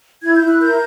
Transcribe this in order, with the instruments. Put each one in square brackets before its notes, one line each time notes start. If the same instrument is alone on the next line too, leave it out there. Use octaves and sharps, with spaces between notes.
[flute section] E4 G#6
G6
E4
F#6
A#4 G6